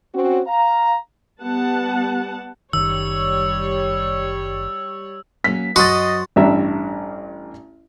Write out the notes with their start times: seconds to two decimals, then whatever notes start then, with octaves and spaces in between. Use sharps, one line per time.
0.14 C4 C#4 F#4
0.47 F5 A#5
1.42 G3 B3 F#5 A5
2.73 F#1 D#3 G3 C#5 E6
5.44 F#3 A#3 C#4 B6
5.76 F#2 F#3 F#4 C5 D#5 C6 A6
6.36 A1 G2 D4 E5 A#5